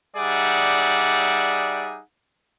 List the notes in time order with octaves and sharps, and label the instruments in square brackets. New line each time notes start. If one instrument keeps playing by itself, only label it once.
[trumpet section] G3 D#4 G#4 D5 E5 F#5